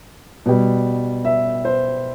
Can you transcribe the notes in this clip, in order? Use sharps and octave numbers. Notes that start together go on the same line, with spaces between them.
B2 G3
E5
C5